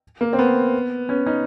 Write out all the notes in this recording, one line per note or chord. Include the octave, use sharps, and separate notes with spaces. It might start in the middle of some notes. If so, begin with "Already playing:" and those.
A#3
C4
B3
B3 C#4
C#4 D#4